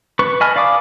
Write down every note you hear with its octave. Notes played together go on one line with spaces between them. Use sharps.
B4 C#6
D#5 G#5 A5 B5 F6
D5 F5 B5 D6 D#6